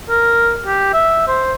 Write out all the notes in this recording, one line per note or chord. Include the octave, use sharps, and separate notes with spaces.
A#4
G4
E5
C5